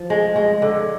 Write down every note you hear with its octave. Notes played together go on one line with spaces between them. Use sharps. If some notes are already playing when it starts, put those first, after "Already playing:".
Already playing: F3
G#3
G#3
D3